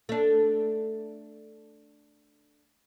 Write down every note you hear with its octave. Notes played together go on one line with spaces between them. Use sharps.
A3 D4